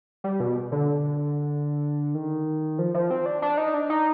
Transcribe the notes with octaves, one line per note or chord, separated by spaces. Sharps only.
G3
B2
D3
D#3
F3
F3
C4
D4
D4
D#4
D4
D#4